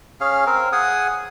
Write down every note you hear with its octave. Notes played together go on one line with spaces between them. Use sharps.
C#4 G#4 F5
C4 A#4
G#4 F#5 G#5 D#6